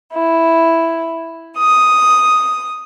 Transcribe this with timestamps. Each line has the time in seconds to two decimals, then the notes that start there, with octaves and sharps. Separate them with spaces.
0.12 E4
1.58 D#6